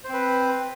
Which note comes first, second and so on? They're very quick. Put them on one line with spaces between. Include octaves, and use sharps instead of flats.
C5 C4 B4